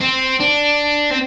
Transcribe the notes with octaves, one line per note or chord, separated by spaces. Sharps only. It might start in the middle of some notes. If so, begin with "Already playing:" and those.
C4
D4
C4